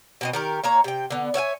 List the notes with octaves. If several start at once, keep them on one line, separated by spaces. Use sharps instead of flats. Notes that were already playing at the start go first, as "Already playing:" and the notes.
B2 C4 D#5
D#3 G4 A#4
A#3 C#5 A#5
C3 G5
D3 B3
C#5 E5 F5 G#5